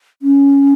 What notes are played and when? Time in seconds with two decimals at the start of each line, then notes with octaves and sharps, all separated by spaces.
0.22 C#4